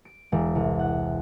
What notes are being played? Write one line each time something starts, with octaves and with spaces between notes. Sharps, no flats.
D7
E1
C2
F#5